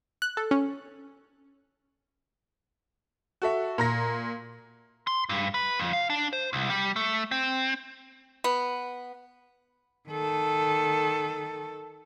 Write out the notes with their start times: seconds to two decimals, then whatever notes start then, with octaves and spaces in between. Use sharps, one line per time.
0.22 F#6
0.37 A4
0.51 C#4
3.42 F#4 A4 E5
3.78 A#2 A#5 A#6
5.07 C6
5.29 G2
5.54 B4
5.80 F2
5.93 F5
6.10 D4
6.33 C5
6.53 C2
6.70 G3
6.96 A3
7.31 C4
8.44 B3
10.09 D#3 A4